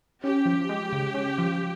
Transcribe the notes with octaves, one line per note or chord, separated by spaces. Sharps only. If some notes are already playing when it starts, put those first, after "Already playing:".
C#4 G4
F3
G#3
C#3
C#4
F3